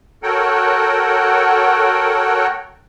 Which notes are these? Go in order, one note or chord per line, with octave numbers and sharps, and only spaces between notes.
F#4 A4 A#4 C#5 F#5 G5